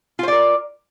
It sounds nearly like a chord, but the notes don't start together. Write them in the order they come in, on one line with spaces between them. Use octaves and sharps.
F4 C5 D5 A#4